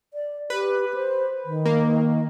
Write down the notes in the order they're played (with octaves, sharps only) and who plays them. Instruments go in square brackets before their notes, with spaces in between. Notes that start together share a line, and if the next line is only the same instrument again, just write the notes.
[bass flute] D5
[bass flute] G4 [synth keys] B4
[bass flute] C5
D#3
[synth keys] A#3